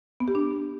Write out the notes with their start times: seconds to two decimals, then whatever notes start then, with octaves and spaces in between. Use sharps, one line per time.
0.20 B3
0.28 G4
0.35 D4